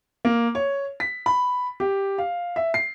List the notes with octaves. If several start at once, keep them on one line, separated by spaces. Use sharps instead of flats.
A#3
C#5
B6
B5
G4
F5
E5
C7